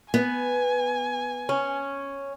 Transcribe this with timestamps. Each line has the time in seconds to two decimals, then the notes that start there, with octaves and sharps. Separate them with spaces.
0.14 B3 G#5
1.49 C#4